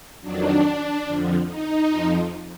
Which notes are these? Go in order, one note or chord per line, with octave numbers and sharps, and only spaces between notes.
F2 D#3 F#3 D4
F2 D3 F3
D#4
F2 F3